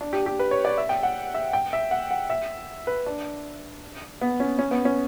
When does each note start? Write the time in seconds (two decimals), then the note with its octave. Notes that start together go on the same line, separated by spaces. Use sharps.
0.01 D4
0.13 G4
0.26 G4
0.39 B4
0.51 C#5
0.65 D5
0.78 E5
0.89 G5
1.03 F#5
1.34 E5
1.53 G5
1.73 E5
1.91 F#5
2.11 F#5
2.30 E5
2.87 B4
3.06 D4
4.21 B3
4.40 C#4
4.59 C#4
4.71 B3
4.85 C#4